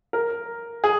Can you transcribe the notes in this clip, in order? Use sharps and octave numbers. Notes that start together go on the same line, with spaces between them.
A#4
G#4